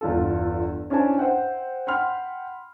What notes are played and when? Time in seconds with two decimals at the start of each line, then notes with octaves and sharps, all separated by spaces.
0.01 G1 E2 F4 A4
0.90 C#4 D4 E4 C5 G#5 A5
1.18 C5 E5 F#5 G5
1.87 F#5 G5 B5 C6 F6